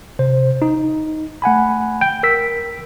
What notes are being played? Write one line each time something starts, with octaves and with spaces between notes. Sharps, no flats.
C3 C5
D#4
A3 F#5 G#5 B5
G5
A#4 E6 B6